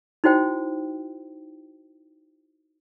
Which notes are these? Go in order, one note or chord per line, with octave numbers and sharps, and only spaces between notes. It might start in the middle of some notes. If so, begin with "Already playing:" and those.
D#4 E4 F#4 C5 G5